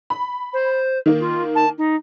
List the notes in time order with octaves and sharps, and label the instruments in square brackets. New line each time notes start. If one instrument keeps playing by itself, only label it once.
[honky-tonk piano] B5
[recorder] C5
[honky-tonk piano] D#3 A#3
[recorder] F4
A5
D#4